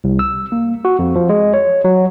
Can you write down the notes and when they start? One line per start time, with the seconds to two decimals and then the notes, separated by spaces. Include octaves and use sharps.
0.04 C2
0.19 E6
0.52 A#3
0.85 F#4
0.99 F2
1.15 F3
1.29 G#3
1.54 C#5
1.84 F#3